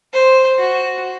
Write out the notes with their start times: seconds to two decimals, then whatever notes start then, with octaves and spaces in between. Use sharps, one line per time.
0.13 C5
0.59 F#4